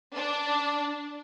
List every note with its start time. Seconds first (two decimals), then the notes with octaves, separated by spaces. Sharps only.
0.14 D4